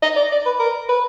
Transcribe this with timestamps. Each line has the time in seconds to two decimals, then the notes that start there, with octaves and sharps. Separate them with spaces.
0.02 D#5
0.16 D5
0.32 D5
0.45 B4
0.59 A#4
0.89 B4